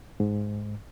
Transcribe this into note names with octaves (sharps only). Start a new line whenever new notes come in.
G#2